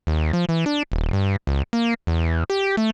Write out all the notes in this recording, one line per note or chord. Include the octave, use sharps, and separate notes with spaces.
D#2
F3
E3
D4
D#1
G2
C#2
A#3
E2
G4
A3